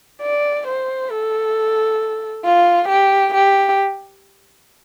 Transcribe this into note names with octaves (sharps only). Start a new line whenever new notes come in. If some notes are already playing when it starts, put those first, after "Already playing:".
D5
C5
A4
F4
G4
G4